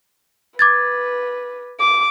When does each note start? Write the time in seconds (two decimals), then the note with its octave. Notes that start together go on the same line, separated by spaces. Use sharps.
0.59 B4 D6 G#6 A6
1.80 D6